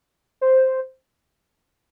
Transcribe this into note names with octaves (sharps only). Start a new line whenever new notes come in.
C5